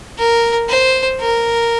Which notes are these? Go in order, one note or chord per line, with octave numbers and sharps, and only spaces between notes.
A#4
C5
A#4